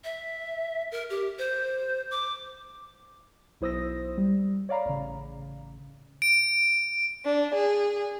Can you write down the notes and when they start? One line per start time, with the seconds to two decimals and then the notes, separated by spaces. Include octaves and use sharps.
0.04 E5
0.92 A#4
1.10 G4
1.39 C5
2.11 D6
3.61 B1 E4 C5 D#6 E6 A#6
4.17 G3
4.69 C#5 D5 F5 A#5 B5
4.85 A1 C#3
6.22 D7
7.24 D4
7.54 G#4